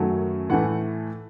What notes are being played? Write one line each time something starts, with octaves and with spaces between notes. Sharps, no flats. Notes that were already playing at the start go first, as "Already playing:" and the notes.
Already playing: F#2 D#3 F#3 A3
A2 E3 A3 F#5